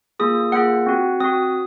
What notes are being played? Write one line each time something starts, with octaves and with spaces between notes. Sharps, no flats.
A#3 F4 G#4 D#6
A#3 F4 G#4 F#5
C4 F#4
C4 F#4 D#6